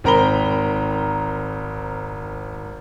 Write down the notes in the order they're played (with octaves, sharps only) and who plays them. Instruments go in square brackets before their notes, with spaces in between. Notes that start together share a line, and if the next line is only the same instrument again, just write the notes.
[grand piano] G#1 C4 A#4 A#5 B5 G7